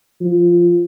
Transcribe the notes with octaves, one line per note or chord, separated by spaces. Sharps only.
F3